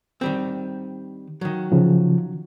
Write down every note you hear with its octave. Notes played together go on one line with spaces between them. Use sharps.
D#3 G3 C4
D#3 F#3
C#3 F3